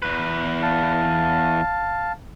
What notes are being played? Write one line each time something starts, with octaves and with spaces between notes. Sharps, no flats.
E2 B4
F5 A5